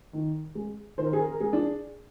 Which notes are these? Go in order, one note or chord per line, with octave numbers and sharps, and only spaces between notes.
D#3
G#3
D#3 C5
A#4
G#4
A#4
A#4
G#3 G#4
D4